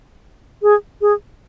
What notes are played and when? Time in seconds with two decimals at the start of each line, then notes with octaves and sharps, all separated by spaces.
0.62 G#4
1.01 G#4